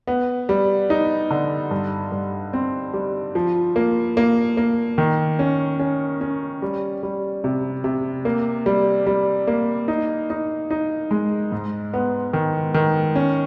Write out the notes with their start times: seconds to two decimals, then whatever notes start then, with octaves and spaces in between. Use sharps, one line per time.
0.07 B3
0.49 G3
0.90 D#4
1.31 D3
1.71 G2
2.12 G2
2.53 C4
2.93 G3
3.35 F3
3.76 A#3
4.17 A#3
4.57 A#3
4.98 D#3
5.39 C#4
5.79 C#4
6.21 C#4
6.62 G3
7.03 G3
7.44 C3
7.84 C3
8.25 A#3
8.66 G3
9.07 G3
9.47 A#3
9.88 D#4
10.30 D#4
10.71 D#4
11.11 G#3
11.52 G#2
11.93 B3
12.33 D#3
12.74 D#3
13.16 C#4